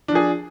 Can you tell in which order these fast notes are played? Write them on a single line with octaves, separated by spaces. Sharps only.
D4 F3 G#4